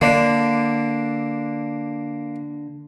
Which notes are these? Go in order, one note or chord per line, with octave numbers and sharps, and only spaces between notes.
D3 A#3 D4